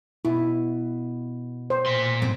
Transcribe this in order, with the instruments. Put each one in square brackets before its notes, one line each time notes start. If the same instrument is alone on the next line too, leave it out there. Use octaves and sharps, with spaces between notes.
[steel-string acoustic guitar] B2 [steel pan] E4
[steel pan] C5
[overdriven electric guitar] A#2 C6
[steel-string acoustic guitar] G#2 B2 C4